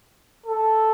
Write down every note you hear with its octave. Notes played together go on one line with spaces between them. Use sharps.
A4